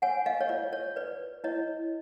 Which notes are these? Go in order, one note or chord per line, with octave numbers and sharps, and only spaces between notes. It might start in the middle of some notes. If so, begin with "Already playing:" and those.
C#5 F#5 G#5
D#5 F5
C#5
F4 D5
C#5
B4 D5
E4 C#5 D#5